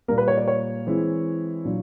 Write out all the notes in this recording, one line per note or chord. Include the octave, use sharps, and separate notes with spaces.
A#2 G3 A#3 A#4
B4
C#5
D5
C#5
E3 G#3 C4 E4
A#2 F#3 A#3 D4